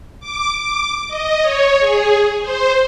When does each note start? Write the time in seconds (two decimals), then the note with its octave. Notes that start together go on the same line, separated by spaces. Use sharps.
0.20 D6
0.59 D6
1.08 D#5
1.41 C#5
1.80 G#4
2.41 C5